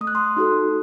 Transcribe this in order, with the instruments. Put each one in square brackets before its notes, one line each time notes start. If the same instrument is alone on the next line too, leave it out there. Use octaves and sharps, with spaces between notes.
[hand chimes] A3 D#6
F#6
C6 D#6
D#4 F#4 A4